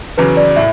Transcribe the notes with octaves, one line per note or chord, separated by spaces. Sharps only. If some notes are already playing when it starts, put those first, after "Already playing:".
E2 C#3 F#3 B4
D5
A2 E5